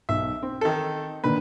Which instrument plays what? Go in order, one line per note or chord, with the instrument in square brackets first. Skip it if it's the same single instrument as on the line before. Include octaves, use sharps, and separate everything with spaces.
[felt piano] B1 [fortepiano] E5
[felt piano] C4
[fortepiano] D#3 A4
[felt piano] A#2 D3 D#3 [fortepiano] B4